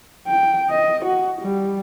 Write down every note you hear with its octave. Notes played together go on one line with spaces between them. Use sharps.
G5
D#5
F#4
G3